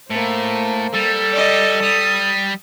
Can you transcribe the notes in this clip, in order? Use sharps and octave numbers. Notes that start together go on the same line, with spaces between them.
A2 A#3 C5
G3 A4
D5 D#5
G3 D#6